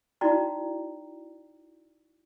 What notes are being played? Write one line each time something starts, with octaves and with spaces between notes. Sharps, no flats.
D#4 E4 F#4 D5 G5 A#5